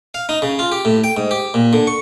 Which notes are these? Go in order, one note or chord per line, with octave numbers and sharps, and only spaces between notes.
F5
D#4
C#3
F4
G4
A2
G5
G#2
G4
A#2
D3
C#6